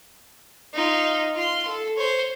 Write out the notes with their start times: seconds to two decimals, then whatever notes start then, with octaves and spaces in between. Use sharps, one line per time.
0.74 D#4 F4
1.35 F4 C6
1.67 A4
1.97 C5 C#5